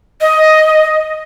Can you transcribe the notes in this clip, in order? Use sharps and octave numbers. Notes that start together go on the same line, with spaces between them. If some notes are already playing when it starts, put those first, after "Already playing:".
D#5